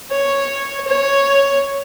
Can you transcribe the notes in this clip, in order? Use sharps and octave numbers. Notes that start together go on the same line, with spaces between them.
C#5
C#5